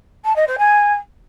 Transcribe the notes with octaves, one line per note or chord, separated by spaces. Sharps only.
A5
D#5
C5
G#5